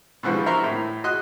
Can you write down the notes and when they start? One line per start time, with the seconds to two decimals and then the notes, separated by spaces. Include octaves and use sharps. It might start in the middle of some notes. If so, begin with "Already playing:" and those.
0.23 B2 D3 E3 F3 G3
0.46 E4 A#4 C5 A#5 C6 C#6
0.64 A2
1.04 F#4 D#5 C6 F#6